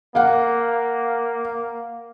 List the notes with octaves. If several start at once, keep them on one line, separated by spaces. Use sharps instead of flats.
A#3 F5 F#5